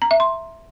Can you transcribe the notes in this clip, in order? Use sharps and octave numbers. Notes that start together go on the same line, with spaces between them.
A#5
E5
C6